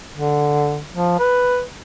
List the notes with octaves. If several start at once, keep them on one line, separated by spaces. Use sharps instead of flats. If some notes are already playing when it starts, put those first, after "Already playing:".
D3
F3
B4